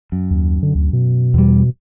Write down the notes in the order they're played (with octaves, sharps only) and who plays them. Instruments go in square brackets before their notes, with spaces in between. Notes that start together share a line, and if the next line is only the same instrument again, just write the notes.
[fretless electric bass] F#2
[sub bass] D#2
D3
D2
B2
[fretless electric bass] E2 G3